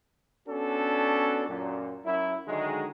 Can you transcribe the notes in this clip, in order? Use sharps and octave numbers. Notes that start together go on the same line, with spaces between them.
B3 C#4 D4 F#4 A4
F#2 A#2
F#2 E4
D3 D#3 F#3 G#3